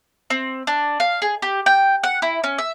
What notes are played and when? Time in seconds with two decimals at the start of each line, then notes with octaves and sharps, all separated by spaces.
0.30 C4
0.67 D4
1.00 F5
1.22 G#4
1.42 G4
1.66 G5
2.03 F#5
2.22 E4
2.44 C#4
2.58 E5